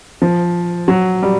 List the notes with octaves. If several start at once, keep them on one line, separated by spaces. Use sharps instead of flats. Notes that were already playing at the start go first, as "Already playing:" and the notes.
F3
F#3
G3